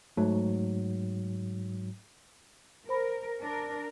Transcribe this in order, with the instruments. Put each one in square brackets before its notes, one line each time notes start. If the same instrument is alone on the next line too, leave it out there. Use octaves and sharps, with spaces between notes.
[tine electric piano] G#2 F#3 [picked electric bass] A3
[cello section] A#4 [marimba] C5 B5
[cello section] D4 A#4